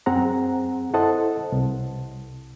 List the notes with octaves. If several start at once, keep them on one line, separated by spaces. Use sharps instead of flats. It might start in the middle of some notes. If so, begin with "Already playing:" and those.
F#2 C4 G#4 F#5 A#5
E4 A4 C5 D#5 F#5 A5
C2